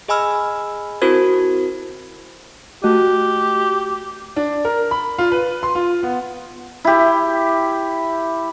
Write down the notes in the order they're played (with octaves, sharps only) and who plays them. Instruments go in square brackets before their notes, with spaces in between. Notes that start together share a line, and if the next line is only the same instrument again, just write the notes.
[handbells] G#4 D#5 G#5 B5 E6 F6
C4 E4 F#4 A#4 C5 G#6
[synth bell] A3 F#4 D#5 [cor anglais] G4
[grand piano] D4
A#4
B5
F4
B4
C6
F4
B3
[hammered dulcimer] E4 G4